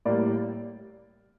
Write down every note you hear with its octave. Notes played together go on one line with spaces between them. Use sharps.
A2 G3 A#3 D5